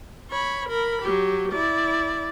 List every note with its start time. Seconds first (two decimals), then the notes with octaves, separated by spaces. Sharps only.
0.31 C#5 B5
0.69 A#4 B5
1.02 F#3 G4
1.52 E4 D5